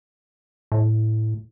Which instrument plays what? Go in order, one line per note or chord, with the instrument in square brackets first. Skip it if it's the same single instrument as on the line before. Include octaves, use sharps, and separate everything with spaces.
[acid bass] A2